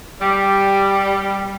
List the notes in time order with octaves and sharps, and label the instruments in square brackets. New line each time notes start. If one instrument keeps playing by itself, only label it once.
[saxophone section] G3